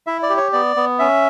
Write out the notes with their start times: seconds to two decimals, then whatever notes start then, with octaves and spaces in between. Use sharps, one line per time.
0.07 E4 E5
0.23 D5
0.30 G4
0.37 C#5
0.53 B3 D5
0.76 B3
0.99 C#4 E5